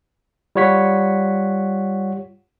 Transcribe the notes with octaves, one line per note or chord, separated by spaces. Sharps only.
G3 F4 C#5 F#5 B6